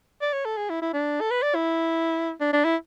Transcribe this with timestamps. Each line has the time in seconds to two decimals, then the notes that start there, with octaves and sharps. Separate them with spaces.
0.22 D5
0.33 C#5
0.45 A4
0.57 G#4
0.70 E4
0.82 E4
0.94 D4
1.21 A4
1.31 B4
1.42 D5
1.55 E4
2.41 D4
2.53 D4
2.65 E4